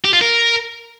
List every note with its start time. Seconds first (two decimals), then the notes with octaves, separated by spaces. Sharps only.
0.05 G4
0.13 F4
0.21 A#4